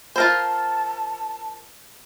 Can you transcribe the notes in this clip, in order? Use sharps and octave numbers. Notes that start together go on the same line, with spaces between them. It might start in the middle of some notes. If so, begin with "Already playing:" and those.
F4 A#4 C5 A5